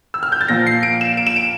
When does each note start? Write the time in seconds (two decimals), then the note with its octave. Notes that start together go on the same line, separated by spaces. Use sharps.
0.14 E6
0.23 F6
0.32 G6
0.41 A6
0.48 A#2 F3 A#3 A#6
0.66 C7
0.83 D7
1.01 E7
1.17 D7
1.27 E7
1.36 D7